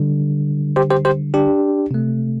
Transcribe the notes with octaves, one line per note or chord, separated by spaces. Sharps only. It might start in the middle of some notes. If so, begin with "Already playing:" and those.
Already playing: D3 G3
G4 C5
G4 C5
G4 C5
D4 G4
C3 A3